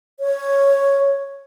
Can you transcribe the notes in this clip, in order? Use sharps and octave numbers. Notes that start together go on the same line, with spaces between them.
C#5